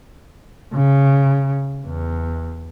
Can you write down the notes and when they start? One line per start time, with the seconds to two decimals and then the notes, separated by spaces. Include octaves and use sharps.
0.74 C#3
1.86 E2